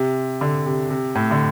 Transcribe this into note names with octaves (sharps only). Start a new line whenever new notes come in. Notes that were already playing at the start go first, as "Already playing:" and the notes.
Already playing: C3
D3
C3
C3
A2
D3